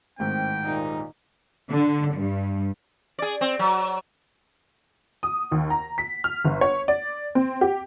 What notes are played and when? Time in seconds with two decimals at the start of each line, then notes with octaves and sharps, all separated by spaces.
0.19 A1 G#2 D#3 C4 G5
0.65 D#2 A#2 D#4
1.71 D3
2.15 G2
3.19 G#4 D5
3.41 C4
3.59 F#3
5.23 D#6
5.52 D#2
5.70 A#5
5.98 B6
6.24 F6
6.45 G1
6.61 C#5
6.88 D5
7.35 C4
7.61 G4